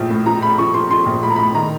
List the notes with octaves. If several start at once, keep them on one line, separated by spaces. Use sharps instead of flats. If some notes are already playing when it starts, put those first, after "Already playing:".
Already playing: A#1 A2 F3 A3
A2
F3 A#5
A3 B5
F3 C#6
F3 C6
F3 C6
A#1
A2 B5
A#5
A2 B5
D#3 A#5